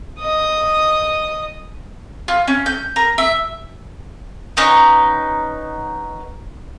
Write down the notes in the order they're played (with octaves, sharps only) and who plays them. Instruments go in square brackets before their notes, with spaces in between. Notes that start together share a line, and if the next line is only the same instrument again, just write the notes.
[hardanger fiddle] D#5 D#6
[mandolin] F4
C#4
G6
A#4
E5
B3 C#4 D#4 A#5